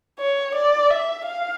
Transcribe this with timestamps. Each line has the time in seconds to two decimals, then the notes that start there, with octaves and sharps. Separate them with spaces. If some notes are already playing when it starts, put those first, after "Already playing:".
0.19 C#5
0.55 D5
0.90 E5
1.27 F5